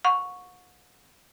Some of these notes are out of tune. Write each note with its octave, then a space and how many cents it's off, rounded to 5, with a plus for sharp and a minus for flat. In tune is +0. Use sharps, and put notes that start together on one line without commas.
F#5 -40 C#6 +0